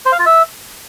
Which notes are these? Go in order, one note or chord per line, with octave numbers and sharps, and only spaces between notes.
C5
F5
F4
E5